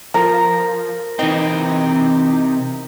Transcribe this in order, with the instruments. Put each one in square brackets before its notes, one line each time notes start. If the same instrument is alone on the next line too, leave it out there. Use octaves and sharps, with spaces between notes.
[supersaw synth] F3 [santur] A#4 A#5
[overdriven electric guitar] C3 G5 [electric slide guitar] E3 C4 [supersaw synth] D#4